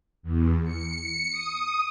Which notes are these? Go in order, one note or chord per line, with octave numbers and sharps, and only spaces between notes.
E2
C#7
D#6